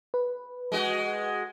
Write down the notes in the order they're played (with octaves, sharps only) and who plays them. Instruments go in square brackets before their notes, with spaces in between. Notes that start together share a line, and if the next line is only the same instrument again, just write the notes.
[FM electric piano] B4
[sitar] G#3 F#4 D#5